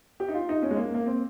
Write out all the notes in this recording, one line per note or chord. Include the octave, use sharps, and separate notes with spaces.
G4
D#4
F4
D#4
C#4
G#3
A#3
A#3
C4